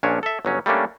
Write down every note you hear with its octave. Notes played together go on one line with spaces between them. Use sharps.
A#1 A#2 C#4 D4 C#5
A4 E5
G1 F#3 C#4
G3 A3 A#3 C#4 D4